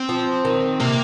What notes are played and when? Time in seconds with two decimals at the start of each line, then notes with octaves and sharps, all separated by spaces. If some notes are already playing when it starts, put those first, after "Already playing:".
Already playing: C4
0.09 F3
0.45 D#3
0.80 C3 A#3